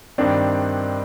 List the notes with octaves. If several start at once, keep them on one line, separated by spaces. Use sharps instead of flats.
G2 D#3 C4 D4